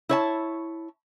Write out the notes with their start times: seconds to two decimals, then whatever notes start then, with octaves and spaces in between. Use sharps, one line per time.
0.09 E4 C#5 A5